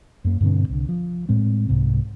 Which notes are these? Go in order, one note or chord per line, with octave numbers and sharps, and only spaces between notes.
F#2 A#3
G2 B2 D3 C4
C2 D3
F3
A2 G#3 C4
C2 G#2 C3